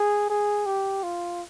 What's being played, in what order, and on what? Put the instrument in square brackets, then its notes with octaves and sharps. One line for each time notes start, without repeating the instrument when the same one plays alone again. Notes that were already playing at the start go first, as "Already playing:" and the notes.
Already playing: [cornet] G#4
G#4
G4
F4